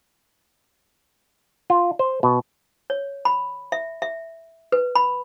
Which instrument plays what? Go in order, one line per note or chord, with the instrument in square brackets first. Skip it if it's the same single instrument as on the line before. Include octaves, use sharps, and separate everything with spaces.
[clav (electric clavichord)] F4
C5
B2
[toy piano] C#5
B5
E5
E5
B4
B5